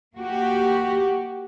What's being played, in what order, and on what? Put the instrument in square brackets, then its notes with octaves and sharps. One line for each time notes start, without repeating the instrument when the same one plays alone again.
[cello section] A#3 F#4 G4